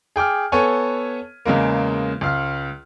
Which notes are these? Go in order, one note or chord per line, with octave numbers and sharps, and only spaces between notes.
G#4 G5 D6 F6
B3 A4 C#5 G#5 C#6
E2 C#3 G#3 A#3
C#2 F5 F6